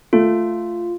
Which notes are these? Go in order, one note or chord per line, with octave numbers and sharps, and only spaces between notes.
A3 F4